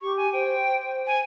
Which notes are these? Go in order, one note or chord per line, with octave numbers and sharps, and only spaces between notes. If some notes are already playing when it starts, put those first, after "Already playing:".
G4 C#6
G#5
C5 G5
G#5